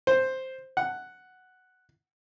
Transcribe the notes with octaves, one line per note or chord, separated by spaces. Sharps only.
C5
F#5